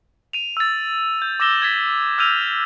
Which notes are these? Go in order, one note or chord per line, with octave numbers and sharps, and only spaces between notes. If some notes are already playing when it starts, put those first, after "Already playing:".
D#7 F7
E6 A6
G6
D6 E6 A#6 E7 G7
G#6 A6 B6
E6 F6 G6 D#7 F7